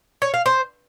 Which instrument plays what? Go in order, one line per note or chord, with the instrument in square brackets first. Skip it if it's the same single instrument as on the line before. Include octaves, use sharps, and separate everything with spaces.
[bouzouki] C#5
F5
C5